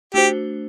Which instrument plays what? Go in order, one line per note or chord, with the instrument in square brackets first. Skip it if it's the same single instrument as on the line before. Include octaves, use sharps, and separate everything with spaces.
[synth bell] A3 D4 F#4 C5 [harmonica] G4